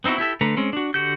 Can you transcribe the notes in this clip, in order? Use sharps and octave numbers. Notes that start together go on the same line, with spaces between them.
B3 C4 D#4 E4 F#4
E4 G4 A4 E5
D3 A3 B4 A#5
G#3 C4 C#4
D4 F#4
D3 F#4 G4 G6